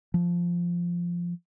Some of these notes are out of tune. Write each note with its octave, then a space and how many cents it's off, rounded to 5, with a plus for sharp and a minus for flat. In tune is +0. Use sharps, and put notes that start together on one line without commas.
F3 -5